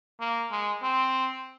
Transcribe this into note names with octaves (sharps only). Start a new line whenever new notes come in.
A#3
G#3
C4